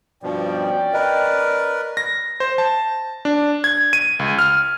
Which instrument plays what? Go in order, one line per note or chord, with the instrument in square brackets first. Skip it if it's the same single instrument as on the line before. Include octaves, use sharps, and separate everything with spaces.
[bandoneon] G2 B2 F3 [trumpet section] C#4 D5 [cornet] G5
[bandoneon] A#4 B4 [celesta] D#5
[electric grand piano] A#6
C5
A5
D4
G#6
D#7
C#2
F6